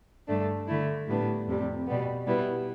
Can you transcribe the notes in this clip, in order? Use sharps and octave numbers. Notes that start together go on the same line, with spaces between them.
G2 D3 A3 D4
D3 A3 E4
A2 G3 B3 D4
F2 C3 G3
B2 G3 B3
B2 G3 B3 E4